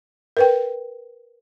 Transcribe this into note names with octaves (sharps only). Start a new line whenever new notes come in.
A#4 B4 G5